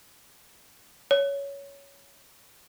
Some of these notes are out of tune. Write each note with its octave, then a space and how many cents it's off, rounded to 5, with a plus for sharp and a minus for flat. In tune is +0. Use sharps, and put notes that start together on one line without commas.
C#5 +10